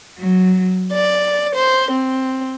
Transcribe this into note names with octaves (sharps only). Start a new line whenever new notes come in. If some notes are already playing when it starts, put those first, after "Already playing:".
F#3
D5
C5
C4